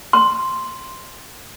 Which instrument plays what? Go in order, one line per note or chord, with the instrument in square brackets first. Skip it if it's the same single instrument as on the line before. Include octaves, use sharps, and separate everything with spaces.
[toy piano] C6